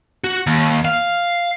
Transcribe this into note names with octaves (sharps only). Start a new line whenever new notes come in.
F#4
D#2
F5